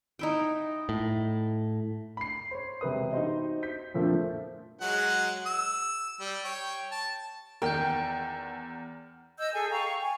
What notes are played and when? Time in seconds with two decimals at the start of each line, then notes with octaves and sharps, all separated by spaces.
0.19 D#4 E4 G5
0.89 A2
2.17 B5 C7
2.51 C5 C#5
2.81 E1 C3 B4 D#6
3.13 D#4 F#4 G4 C5 D#5
3.63 G6 B6
3.94 F2 A#2 F3 A3 A#3 D4
4.81 F#3 G#3 F#5
5.46 E6
6.21 G3
6.45 C#5 G5
6.92 A5
7.62 E2 D#3 G5 A#5 F6 G6
9.39 D#5 E6 G6
9.54 G#4 A4 G#5
9.70 F5 G5 A#5 C#6
10.00 G#5